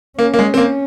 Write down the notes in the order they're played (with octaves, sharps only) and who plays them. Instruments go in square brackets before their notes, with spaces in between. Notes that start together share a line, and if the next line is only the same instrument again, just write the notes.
[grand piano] A#3 [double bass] C#4
[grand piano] A#3
G#3
C4
A#3